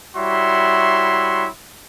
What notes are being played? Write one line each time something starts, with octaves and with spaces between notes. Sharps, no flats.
G3 E4 F#4 C#5 E5 C6